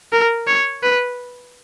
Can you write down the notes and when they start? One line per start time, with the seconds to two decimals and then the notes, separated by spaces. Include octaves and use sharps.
0.13 A#4
0.48 C#5
0.83 B4